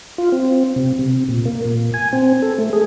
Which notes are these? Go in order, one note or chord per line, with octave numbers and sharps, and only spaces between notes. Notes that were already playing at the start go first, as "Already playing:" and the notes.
F4
C4
C3
C3
A#2
A#3
A#2
G#5
C4
A4
A3
G#4